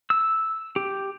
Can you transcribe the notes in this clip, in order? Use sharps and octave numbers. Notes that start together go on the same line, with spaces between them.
E6
G4